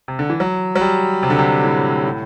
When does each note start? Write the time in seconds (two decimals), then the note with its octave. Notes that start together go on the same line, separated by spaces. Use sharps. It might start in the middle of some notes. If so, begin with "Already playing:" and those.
0.08 C3
0.19 D3
0.30 E3
0.40 F#3
0.76 F#3
0.81 G3
1.23 C3
1.30 D3
1.39 C3
1.64 A2
2.05 A2